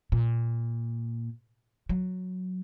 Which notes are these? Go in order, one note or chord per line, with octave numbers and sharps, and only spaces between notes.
A#2
F#3